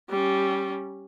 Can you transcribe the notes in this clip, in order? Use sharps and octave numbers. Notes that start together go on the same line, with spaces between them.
G3 C#4